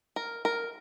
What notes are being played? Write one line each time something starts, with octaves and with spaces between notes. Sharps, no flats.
A#4
A#4